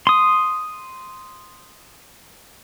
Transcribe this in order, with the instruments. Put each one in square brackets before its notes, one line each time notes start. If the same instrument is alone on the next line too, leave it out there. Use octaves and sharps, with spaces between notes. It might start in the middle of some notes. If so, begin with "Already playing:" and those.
[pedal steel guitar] C6 D#6